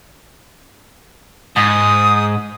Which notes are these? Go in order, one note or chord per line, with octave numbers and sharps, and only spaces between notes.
G#2 D#6